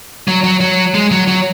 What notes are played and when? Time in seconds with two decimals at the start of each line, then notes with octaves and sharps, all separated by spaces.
0.28 F#3
0.44 F#3
0.60 F#3
0.94 G#3
1.11 F#3
1.28 F#3